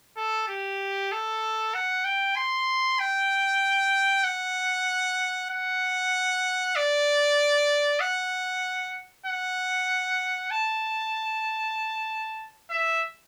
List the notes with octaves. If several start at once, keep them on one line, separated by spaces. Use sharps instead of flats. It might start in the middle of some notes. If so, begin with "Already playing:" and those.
A4
G4
A4
F#5
G5
C6
G5
F#5
F#5
D5
F#5
F#5
A5
E5